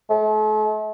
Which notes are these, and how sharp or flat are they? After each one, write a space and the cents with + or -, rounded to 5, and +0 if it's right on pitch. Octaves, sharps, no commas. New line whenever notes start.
A3 -45